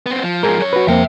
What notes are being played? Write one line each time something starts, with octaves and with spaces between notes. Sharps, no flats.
B3 C4
F3
G#2 F3 G#4 A#4
F#2 C#5
F#4 B4
F2 A#3 C4 E5 G5